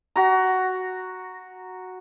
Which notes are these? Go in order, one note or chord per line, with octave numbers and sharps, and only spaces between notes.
F#4 A#5